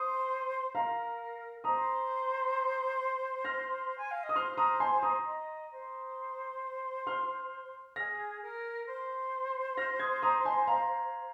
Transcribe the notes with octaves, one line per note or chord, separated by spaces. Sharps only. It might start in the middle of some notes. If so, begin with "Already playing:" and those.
Already playing: C5 D#6
A#4 F5 A#5
C5 A#5 D#6
F6 A#6
G#5
F5
D#5
D#6
C5 C6 F6
A#5 D#6
G#5 C6
A#5 D#6
D#5
C5
C6 F6
G#4 F6 A#6
A#4
C5
F6 A#6
D#6 G#6
A#5 D#6
G#5 C6
F5 A#5